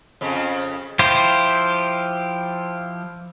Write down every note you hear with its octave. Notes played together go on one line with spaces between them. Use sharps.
F2 C#3
F3 E4 F4 G4 C5